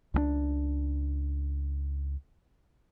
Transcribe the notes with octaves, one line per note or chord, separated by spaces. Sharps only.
C#2 F#3 D4